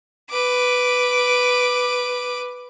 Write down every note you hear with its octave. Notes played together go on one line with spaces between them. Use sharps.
B4 D6